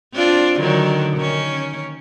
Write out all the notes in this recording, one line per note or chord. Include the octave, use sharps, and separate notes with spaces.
C4 D4 F4
D3 D#3 F#3
D#3 C#4